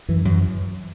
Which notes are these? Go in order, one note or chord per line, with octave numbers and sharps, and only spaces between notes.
F#2 E3
F#2 F#3